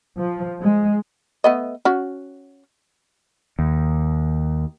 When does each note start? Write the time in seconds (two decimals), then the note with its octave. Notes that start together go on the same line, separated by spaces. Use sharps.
0.17 F3
0.62 G#3
1.44 A3 B3 D#5
1.85 C#4 F#4
3.59 D#2